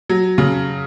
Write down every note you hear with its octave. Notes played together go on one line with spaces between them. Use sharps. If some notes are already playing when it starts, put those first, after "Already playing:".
F#3
C#3